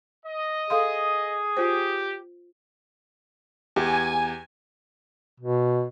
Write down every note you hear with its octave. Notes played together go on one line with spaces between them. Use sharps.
D#5
G#4 A4 F5 C6
F4 G4 C5
E2 G4 G#5
B2